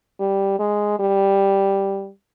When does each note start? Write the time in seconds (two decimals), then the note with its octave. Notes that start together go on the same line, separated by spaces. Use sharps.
0.20 G3
0.59 G#3
1.00 G3